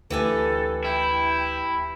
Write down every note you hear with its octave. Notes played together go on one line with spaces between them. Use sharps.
D2 E3 G4 A4 B4 G#5
E4 G5